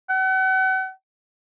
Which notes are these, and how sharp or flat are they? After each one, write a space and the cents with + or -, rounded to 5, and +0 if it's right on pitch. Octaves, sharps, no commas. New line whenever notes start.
F#5 +40